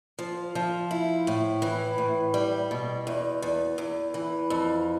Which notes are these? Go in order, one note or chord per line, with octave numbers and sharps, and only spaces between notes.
F3
F3
E4
A2
E3
A2
G3
B2
E2
E2
E2
E3
F2